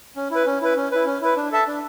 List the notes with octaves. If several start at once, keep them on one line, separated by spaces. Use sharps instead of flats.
C#4
E4 B4
C#4
E4 B4
C#4
E4 B4
C#4
E4 B4
D4
A4 E5 A5
D4